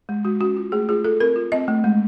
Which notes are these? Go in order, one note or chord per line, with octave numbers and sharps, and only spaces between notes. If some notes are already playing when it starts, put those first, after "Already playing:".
G#3
G#3 F#4
C#4 F#4
F4
A3 G#4
F4 G#4
F4 A4
C4 A#4
F4
C4 D#5
A3
G#3